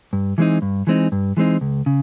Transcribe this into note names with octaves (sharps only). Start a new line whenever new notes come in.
G2
E3 G#3 C4 D#4
G2
E3 G#3 C4 D#4
G2
E3 G#3 C4 D#4
C#2
C#3